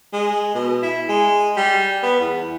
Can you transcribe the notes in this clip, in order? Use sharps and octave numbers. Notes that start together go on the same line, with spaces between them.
G#3
B2
E4
G#3
G3
B3
E2